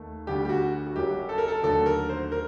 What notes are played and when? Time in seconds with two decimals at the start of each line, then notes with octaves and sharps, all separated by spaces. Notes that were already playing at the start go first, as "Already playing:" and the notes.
Already playing: D#2 D#3 A3
0.27 D2 D3 G3 G4
0.45 G4
0.49 F#4
0.87 F#4
0.95 F#1 F#2 F#3 G4
1.29 A4
1.38 A#4
1.48 A4
1.63 D#2 D3 F#3 A3 A4
1.86 A#4
2.09 C5
2.32 A#4